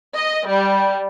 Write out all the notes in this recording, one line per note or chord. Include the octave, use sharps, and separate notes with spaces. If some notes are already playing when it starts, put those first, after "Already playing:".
D#5
G3